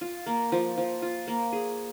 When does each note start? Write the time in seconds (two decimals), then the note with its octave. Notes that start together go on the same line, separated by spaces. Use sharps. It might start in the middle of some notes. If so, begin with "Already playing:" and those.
0.01 F4
0.26 A#3
0.52 F3
0.78 F3
1.02 F4
1.27 A#3
1.53 G#4